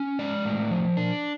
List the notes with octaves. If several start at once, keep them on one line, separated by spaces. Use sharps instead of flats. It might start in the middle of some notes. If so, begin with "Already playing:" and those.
Already playing: C#4
G#3 D5
A2
F3
D4